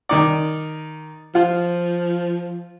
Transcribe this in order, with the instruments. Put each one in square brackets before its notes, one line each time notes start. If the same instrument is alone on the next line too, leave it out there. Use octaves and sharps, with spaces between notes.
[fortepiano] D#3 D#4 D5
[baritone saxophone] F3 [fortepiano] F4